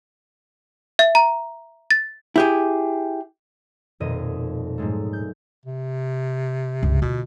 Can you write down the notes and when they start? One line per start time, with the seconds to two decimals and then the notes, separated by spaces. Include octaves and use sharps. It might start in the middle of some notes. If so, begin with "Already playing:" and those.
0.99 E5
1.15 A#5
1.91 A6
2.36 E4 G4 G#4
4.00 D#1 F2 B2 D#5 D#7
4.78 G#2 F#3 G#3 A3
5.13 G6
5.65 C3
6.83 C#2 G2
7.02 D2 B2 F4